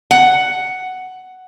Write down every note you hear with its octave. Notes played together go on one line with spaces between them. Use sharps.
F#5